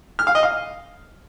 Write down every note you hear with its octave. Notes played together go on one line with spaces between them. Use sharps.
F6
F5
D#5
F5